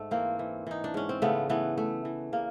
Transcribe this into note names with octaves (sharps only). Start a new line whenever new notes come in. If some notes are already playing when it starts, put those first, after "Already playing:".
Already playing: G#2 A3
E3 A#3 C4
E3
E3 D#4
D4
G#2 C#4
C4
C#3 A3 B3
E3 A3 B3
A3
E3
C#3 A#3